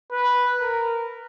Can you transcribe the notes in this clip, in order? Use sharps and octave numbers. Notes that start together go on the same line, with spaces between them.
B4
A#4